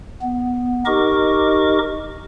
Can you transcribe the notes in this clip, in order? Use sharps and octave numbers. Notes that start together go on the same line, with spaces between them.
B3
D#4 G4 A#4 D#5 C#6 D6